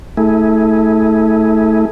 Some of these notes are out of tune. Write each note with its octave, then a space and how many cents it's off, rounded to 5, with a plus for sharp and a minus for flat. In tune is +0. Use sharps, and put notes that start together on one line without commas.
A3 +0 E4 -30 G#4 +0